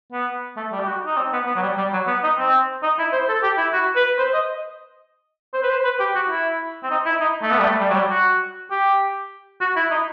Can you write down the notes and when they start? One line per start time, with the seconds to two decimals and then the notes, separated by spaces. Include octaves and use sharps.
0.12 B3
0.57 A3
0.72 G3
0.80 G4
0.88 F#4
1.06 D#4
1.17 C4
1.33 B3
1.47 B3
1.56 F#3
1.62 G3
1.78 G3
1.93 F#3
2.07 B3
2.23 D#4
2.38 C4
2.83 D#4
2.99 E4
3.12 C5
3.29 A4
3.43 G4
3.58 E4
3.73 F#4
3.96 B4
4.18 C5
4.33 D#5
5.54 C5
5.63 B4
5.70 C5
5.85 B4
6.00 G4
6.15 F#4
6.30 E4
6.83 C4
6.91 D#4
7.06 E4
7.21 D#4
7.42 A3
7.51 B3
7.59 G3
7.65 A3
7.80 G3
7.90 F#3
7.95 G3
8.10 F#4
8.71 G4
9.61 F#4
9.76 E4
9.91 D#4